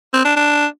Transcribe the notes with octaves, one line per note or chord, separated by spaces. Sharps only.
C4
D4
D4